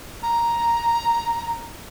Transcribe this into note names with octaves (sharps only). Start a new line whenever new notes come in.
A#5